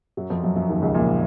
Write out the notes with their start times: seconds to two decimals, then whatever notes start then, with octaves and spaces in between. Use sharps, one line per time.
0.17 F#2 F#3
0.30 F2 F3
0.44 F#2 F#3
0.56 F#2 F#3
0.69 D#2 D#3
0.82 C#2 C#3
0.94 A#1 A#2